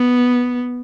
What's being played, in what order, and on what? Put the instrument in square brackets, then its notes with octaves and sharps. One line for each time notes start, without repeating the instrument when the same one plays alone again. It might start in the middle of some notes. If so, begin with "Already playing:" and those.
Already playing: [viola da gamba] B3